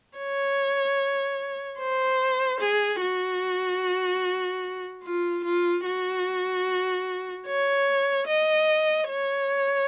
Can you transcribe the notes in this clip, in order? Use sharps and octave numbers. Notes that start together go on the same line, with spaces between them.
C#5
C5
G#4
F#4
F4
F4
F#4
C#5
D#5
C#5